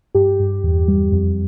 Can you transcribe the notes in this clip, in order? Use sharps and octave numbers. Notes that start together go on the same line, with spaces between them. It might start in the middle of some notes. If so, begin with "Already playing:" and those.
G2 G4
G2
E2
G3
F2